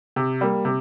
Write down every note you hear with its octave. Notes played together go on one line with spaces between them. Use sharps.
C3
G3 A#3
C3